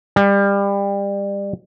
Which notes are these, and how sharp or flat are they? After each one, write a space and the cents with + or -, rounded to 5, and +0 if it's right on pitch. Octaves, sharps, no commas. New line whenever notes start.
G3 +25